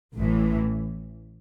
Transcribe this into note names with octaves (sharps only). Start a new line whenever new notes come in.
A1 A2 E3